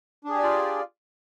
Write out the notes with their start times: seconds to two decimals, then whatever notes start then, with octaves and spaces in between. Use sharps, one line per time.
0.24 D4
0.29 G#4
0.34 G4
0.39 D5
0.43 F4